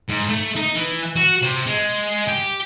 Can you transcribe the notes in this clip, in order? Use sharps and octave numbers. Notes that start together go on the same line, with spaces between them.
G#2
A3
D#4
E3
F#4
C3
G#3
G4